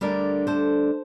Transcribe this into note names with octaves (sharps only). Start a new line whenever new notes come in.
D2 D3 G3 D4 A#4 D5
A4 C5